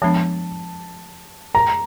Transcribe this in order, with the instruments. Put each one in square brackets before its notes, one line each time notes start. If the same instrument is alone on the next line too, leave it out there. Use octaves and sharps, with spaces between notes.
[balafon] F3 G#3 B3 D4 [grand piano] A5
[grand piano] A#5